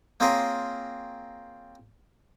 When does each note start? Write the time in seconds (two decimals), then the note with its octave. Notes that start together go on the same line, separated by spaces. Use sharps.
0.20 A#3 C4 F4 G#4 A#4 C#5